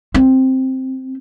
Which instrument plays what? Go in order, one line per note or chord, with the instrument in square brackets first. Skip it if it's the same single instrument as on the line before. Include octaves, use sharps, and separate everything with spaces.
[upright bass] C4